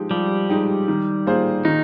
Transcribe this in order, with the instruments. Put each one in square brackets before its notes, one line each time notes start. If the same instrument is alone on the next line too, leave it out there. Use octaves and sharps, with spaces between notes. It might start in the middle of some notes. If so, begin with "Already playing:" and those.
Already playing: [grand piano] F3 G#3 D#4 G4
[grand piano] F3 [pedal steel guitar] G3
[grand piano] G#3 D#4 G4
D#3
A#3 F4 G#4 C5
[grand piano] D#3 [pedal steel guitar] D#4